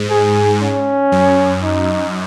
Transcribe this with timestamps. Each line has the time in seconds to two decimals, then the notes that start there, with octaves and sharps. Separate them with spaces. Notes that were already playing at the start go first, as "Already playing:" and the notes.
Already playing: G#2
0.10 G#4
0.62 C#4
1.12 F#2
1.63 D#4